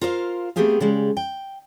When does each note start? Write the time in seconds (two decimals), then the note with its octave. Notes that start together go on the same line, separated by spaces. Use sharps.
0.01 F4 A#4 C5 D5 F5
0.56 A3 B3 C4 G4 G#4 F5
0.80 C#3 G3 G#3
1.17 G5